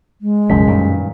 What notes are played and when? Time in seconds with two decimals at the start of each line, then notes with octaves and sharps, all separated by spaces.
0.21 G#3
0.50 B1 F#2 C#3 F3 B6
0.67 G2 A#2 D#3